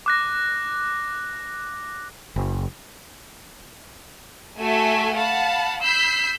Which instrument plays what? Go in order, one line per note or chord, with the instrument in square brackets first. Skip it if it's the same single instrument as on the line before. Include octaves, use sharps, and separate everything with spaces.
[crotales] D6 F#6 A#6
[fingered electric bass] F#1
[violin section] A3 F#4 A4 E5 G#5
F5 F#5 A5 B5
B5 E6 G6 B6 C7